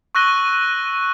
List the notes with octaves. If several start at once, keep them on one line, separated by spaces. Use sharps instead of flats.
C#6 E6 F#6 A#6 D#7 G7